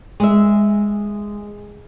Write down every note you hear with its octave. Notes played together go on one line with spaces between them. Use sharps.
G#3 E5